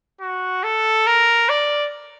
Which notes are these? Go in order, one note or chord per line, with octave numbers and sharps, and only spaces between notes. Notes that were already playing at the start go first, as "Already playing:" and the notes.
F#4
A4
A#4
D5